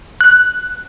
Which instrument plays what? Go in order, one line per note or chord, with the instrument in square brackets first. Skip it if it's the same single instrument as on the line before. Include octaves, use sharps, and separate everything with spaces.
[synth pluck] F#6